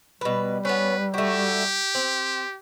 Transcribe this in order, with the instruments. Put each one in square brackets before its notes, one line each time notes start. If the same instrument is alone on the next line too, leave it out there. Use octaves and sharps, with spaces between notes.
[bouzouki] B2 B4 [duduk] G3
[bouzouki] B3 C#4 [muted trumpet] B4
[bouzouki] A3 F#4 [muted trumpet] G4
[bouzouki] C4